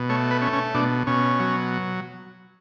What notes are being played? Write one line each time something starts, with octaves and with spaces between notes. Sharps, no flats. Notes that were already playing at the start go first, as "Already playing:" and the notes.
Already playing: B2
A3 C#5
B4
C#4
C#4
B2 D4
B2 C#4
F#3